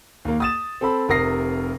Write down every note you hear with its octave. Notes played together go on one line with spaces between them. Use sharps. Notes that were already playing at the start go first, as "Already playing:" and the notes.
D#2 A#3
D#6 A6 E7
C4 A4 B5
F1 C3 A#4 D#6 A#6 C7